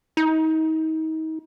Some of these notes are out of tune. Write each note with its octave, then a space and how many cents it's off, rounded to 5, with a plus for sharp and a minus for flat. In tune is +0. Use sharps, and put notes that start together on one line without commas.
D#4 +35